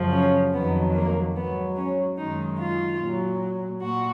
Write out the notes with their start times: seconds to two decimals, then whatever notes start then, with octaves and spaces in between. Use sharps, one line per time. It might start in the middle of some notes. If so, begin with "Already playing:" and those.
Already playing: F#2 C#3 F3
0.12 C#4
0.53 F2 D#3 F#3 B3
0.95 A#3
1.35 G#2 F#3 B3
1.77 C#4
2.18 F#2 D#3 G#3 D#4
2.60 F4
3.00 A#2 F#3
3.83 A#2 F#4